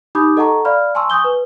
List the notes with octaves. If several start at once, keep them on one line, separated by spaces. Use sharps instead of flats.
D#4 G4 B5 D6 D#6 G6
A4 D#5 F#5 A5 A#5 C#6
D5 F5 B5 F6
G#5 A5 C6 C#6 E6
G#5 C#6 D#6 G6 G7
B4